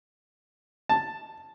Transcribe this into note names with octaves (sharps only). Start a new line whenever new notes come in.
A5